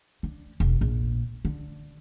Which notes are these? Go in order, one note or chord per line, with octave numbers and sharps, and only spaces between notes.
D3
E1
A#1
D3